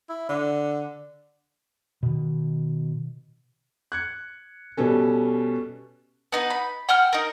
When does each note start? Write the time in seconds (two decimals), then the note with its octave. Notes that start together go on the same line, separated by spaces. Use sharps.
0.09 E4
0.29 D3
2.03 B2 D#3
3.92 F#6 G#6 C#7
4.77 B2 G3 B3 C#4 A4
6.32 B3 D#4 B4
6.50 B5
6.89 F#5 G5 E6 F6
7.13 D#4 A#4